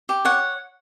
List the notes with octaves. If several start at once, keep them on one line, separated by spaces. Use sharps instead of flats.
G4
C#5 F#5